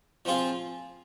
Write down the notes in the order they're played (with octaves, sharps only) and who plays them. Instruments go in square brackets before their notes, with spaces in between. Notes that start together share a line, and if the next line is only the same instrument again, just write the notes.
[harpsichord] F3 C4 F4 G#4